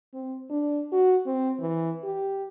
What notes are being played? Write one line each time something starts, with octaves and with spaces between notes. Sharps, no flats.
C4
D4
F#4
C4
E3
G4